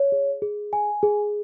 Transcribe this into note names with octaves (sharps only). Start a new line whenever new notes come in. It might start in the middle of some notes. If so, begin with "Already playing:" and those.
Already playing: C#5
G#4
G#4
G#5
G#4